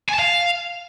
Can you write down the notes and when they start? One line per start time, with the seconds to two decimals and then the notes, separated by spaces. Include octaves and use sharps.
0.09 G#5
0.14 A5
0.19 F5